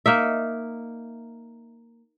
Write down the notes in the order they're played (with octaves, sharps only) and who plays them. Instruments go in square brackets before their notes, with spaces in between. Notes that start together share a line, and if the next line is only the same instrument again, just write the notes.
[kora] A#3 D#4 E5